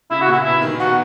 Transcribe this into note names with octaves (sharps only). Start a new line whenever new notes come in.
C#3 E4
F#4
A#2 E4
B2 E4
D#3
B3 F#4